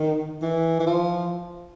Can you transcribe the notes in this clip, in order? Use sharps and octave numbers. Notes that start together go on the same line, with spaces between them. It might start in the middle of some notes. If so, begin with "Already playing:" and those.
Already playing: D#3
E3
E3
F3